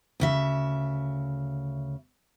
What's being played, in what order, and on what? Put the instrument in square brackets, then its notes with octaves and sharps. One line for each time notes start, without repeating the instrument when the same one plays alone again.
[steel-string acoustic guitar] D2 C#3 E5